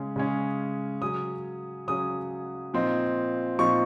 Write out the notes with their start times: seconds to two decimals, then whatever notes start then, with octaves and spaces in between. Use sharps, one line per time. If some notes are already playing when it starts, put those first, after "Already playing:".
Already playing: C#3 G#3 C#4
0.16 C#3 G#3 C#4
1.02 C#3 F#3 C#4 D#6
1.87 C#3 F#3 C#4 D#6
2.74 A#2 F3 C4 D#4
3.59 A#2 F3 C4 D#4 C#6